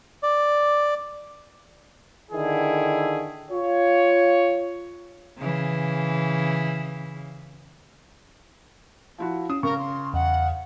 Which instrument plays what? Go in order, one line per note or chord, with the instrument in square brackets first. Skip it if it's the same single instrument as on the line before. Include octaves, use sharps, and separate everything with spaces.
[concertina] D5
[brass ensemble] D3 D#3 E4 G#4
F4 C#5
[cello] C#3 E3
[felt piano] F3 E4 F#4
[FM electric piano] C#4 [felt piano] D#6
[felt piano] C#3 [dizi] A#4 [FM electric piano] C#6
[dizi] C6
[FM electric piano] E2 [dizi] F#5